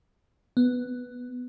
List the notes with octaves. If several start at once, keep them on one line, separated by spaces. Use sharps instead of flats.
B3